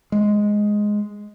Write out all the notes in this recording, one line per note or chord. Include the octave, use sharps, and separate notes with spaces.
G#3